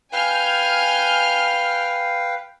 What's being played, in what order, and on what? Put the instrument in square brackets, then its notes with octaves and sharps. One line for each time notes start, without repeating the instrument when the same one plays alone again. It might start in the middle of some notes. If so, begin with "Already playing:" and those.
[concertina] B4 F5 G5 [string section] G#5 F6 G6